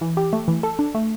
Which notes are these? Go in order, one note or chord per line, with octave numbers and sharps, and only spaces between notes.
E3
G4
A3
E3
A4
D4
A3